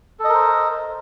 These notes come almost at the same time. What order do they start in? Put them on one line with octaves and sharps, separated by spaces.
A4 D#5 A#4 C5